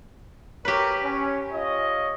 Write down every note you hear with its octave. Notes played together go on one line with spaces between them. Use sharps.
G4 A#4 B4 C#5
C#4
F4 C#5 D#5